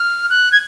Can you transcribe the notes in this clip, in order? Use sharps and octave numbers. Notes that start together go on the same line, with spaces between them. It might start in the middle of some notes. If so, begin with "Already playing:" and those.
Already playing: F6
F#6
G#6